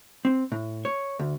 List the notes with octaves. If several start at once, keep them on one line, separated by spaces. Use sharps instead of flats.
C4
A2
C#5
D2